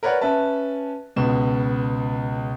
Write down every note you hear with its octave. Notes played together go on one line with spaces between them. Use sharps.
A#4 B4 C#5 D5 F#5
C#4 B4 E5 A5
C#2 B2 E7